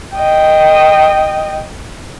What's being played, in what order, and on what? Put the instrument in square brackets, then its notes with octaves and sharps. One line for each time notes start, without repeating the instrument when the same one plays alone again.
[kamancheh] D#5 G5